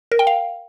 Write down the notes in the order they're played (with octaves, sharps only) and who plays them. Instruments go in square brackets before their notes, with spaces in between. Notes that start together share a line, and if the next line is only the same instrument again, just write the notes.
[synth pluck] A#4
G5
F5